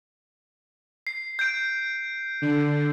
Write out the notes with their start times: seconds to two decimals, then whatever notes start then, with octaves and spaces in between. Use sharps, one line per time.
1.07 C7
1.39 G6 D7
2.42 D3